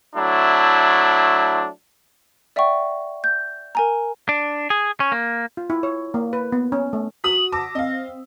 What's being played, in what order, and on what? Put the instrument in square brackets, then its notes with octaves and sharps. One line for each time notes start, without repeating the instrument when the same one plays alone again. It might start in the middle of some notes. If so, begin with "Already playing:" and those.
[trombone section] F#3 A3 D4 E4
[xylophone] D5 E5 F#5 G5 C#6
G6
A#4 G#5 A#5
[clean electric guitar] D4
G#4
C#4
A#3
[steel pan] F4
E4
C#5
A#3
B4
B3
C#4
A3
[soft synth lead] F#4 [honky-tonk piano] D#6 B6 [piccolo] F#7
[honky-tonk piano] A5 D6 E6 [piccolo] A#6
[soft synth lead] C4 [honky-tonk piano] D#5 F5